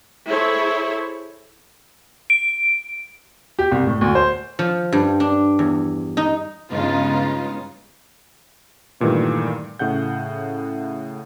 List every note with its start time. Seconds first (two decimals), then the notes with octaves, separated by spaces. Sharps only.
0.27 E4 G#4 A4 C5 C#5
2.30 D7
3.59 G4
3.72 C2
3.87 A2
4.01 D2
4.15 C5
4.59 F3
4.92 G2
5.20 D4
5.59 E2
6.17 D#4
6.71 G2 C#3 G#3 B3 D#4 F4
9.00 G2 A#2 D#3 E3 G3 A3
9.79 A2 C#3 F#5 G6